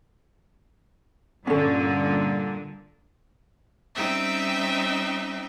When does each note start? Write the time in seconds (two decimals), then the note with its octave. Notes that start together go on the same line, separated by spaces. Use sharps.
1.47 G2 A#2 D3 C#4 A4
3.94 G3 C4 C#4 D#4 E5 G5